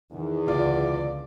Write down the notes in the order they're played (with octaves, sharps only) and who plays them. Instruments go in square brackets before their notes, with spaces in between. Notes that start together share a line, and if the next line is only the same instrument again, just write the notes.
[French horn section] E2 [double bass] D#3
[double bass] C#2 D3 [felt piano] F4 [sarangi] D5